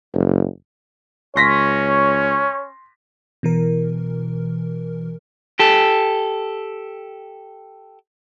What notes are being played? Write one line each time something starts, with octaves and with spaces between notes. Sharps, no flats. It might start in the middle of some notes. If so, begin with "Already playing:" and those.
F#1
C#2 C#4 C#5 C6 A#6 B6
B2 E3 A#4
G4 A4